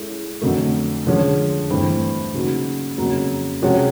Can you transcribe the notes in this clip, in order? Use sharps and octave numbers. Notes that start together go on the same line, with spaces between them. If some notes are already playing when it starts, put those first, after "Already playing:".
Already playing: G#3 C#4 E4 A4
F2 D3 F#3 A3
D3 F3 G#3 C#4
G2 E3 A3 C4
C#3 F#3 A#3 D#4 F#4
F2 C#3 F#3 A#3
C3 F3 G#3 C#4 F#4